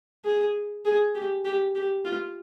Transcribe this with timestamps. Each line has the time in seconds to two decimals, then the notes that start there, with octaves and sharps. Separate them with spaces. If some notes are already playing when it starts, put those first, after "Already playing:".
0.25 G#4
0.85 G#4
1.15 G4
1.45 G4
1.75 G4
2.05 F4